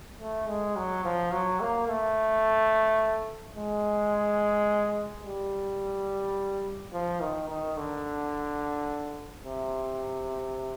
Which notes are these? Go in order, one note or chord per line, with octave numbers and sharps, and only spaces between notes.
A3
G#3
F#3
F3
F#3
A#3
A3
G#3
G3
F3
D#3
D#3
D3
C3